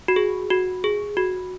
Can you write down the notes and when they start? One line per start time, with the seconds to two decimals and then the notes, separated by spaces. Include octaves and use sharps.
0.08 F#4
0.16 G#4
0.50 F#4
0.84 G#4
1.17 F#4